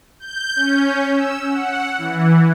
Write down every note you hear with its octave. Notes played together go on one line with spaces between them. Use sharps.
G6
C#4
E6
F#5
E3